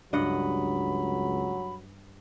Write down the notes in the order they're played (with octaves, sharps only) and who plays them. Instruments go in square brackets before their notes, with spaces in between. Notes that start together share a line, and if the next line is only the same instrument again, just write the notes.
[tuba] C#2 [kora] G2 D#5 F#5 [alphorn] F#3 [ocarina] B5